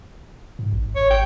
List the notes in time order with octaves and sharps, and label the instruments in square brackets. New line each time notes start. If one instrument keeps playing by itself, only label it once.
[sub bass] G#2
A1
[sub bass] G#1 [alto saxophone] C#5
[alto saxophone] G5